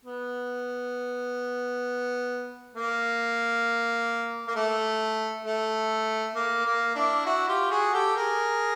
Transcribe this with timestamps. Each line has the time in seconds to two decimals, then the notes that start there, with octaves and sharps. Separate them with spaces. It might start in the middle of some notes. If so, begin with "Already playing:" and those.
0.05 B3
2.75 A#3
4.48 A#3
4.55 A3
5.45 A3
6.35 A#3
6.65 A#3
6.95 D4 E4
7.26 E4 F#4
7.48 F4 G4
7.70 F#4 G#4
7.93 G4 A4
8.16 G#4 A#4